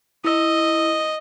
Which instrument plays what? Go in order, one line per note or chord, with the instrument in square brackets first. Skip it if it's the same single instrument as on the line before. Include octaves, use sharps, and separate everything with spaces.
[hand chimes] E4 E6 [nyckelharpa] D#5